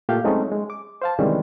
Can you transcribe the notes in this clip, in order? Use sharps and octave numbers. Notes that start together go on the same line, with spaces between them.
A#2 A3 G4 A4 F5 G6
F#3 G#3 A3 C4 C#4 D#4
G#3
D6
C5 F5 A5
C3 D#3 E3 G3 G#3 C#4